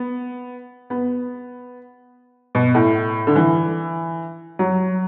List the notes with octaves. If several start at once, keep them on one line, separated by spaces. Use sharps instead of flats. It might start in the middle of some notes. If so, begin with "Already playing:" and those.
Already playing: B3
B3
B2
A2
D3
E3
F#3